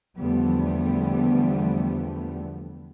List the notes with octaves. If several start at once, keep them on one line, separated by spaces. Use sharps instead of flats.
E2 D3 F3 G3 A3 B3